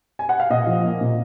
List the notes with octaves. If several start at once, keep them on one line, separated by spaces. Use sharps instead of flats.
G#5
F#5
F5
A#2 D#5
F3
A#3
A#2